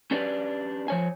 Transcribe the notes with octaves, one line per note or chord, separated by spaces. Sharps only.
C#4 D4 G4 B4 D5
F3 C#5 G#5